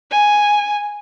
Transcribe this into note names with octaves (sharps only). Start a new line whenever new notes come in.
G#5